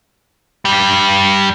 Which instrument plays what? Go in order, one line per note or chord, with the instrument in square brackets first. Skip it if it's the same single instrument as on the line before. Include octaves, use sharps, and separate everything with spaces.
[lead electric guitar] G2 G3